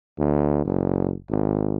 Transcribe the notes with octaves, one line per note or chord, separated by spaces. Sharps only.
D2
F#1
G#1